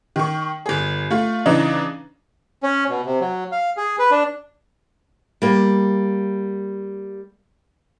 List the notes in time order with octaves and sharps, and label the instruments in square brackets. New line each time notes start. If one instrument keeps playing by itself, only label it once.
[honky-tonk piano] D#3 C#6
G1 G#4
A3 F4
C#3 E3 D4 D#4
[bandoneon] C#4
B2
C3
F#3
F5
G#4
B4
D4
[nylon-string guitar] G3 A#3